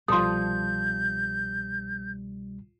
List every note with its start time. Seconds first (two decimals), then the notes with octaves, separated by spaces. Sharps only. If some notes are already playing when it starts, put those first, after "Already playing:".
0.08 C2 B2 F3 G3 A4 C6 D#6 G6